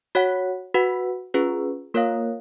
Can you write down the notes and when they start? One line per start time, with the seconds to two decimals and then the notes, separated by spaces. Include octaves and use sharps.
0.15 F#4 C#5 F#5
0.74 F#4 B4 F#5
1.34 C#4 F4 G#4 B4
1.94 A#3 F4 A#4 C#5 F5